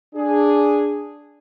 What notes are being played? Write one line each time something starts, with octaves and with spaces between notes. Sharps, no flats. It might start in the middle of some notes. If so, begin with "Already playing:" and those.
D4 G#4